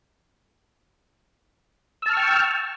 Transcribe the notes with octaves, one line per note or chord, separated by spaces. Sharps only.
G5 A5 C#6 E6 F6